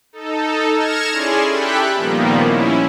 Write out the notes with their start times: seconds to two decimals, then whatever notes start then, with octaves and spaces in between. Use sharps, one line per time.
0.13 D#4 A4
0.73 F6 G#6 A#6 C#7 E7
1.11 C#4 E4 G#4 D5 G#5 C6
1.49 G4 A4 E5 G5 B5 F#6
1.95 A#2 D#3 F3 G3 A#3 B3
2.39 C#4 E4